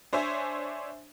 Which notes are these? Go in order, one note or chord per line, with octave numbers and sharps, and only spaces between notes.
D4 C5 C#5 E5 G#5